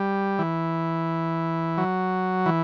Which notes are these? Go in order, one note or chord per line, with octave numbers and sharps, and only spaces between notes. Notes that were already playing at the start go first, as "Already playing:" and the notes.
Already playing: G3
E3
F#3
E3